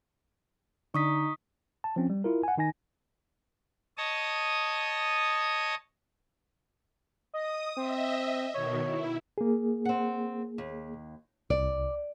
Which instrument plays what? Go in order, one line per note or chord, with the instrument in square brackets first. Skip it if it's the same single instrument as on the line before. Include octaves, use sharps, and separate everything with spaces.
[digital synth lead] D3 [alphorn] D#4 [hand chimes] C#6 D#6 B6
[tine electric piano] A5
F3 C4 C#4
G3
E4 F4 A#4
F#5 G#5
D#3 D#4 G#5 A#6
[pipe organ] C#5 D#5 A5 D#6
[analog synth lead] D#5 [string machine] D#6
[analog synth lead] C4 [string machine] D#5 E5
[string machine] B2 D#3 [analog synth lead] C#5
[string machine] E4
[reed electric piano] A#3 G#4
[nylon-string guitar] C4 F#5
D#2
[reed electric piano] C2 [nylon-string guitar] D5